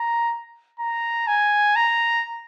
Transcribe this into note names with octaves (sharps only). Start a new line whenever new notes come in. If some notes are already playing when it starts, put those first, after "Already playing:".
Already playing: A#5
A#5
G#5
A#5